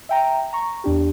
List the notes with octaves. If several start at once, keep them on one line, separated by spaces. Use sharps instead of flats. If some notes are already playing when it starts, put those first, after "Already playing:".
E5 G5 A#5
A#5 C#6
E2 D4 G4